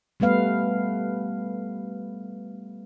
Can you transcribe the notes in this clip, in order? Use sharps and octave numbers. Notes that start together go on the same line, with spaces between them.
G3 A3 B3 B4 F5